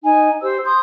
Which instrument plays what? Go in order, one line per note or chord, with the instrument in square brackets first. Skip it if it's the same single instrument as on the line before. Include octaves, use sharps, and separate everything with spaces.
[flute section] D#4 G#5
G4 C5 E6
C6 D#6 G6